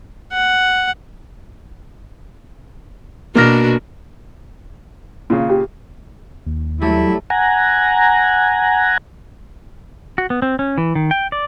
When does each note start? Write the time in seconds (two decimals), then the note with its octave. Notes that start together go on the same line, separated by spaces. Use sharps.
0.33 F#5
3.35 B2 A#3 D4 F#4 F6 A#6
5.30 A#2 C#3
5.50 G4
6.47 D#2
6.81 F#3 G3 A3 E4
7.30 F#5 G#5 A#5
10.18 F#4
10.30 B3
10.42 C4
10.59 C#4
10.78 E3
10.95 D#3
11.11 G5
11.32 D5